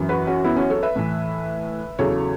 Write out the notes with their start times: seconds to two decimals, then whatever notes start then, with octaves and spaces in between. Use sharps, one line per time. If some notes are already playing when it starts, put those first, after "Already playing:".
Already playing: F#2 E3
0.09 F#4 B4
0.27 C#4 F#4
0.44 B3 E4
0.56 C#4 F#4
0.70 A4 C#5
0.83 B4 E5
0.96 A2 E3
1.99 E2 C#3 F#3 A4 C#5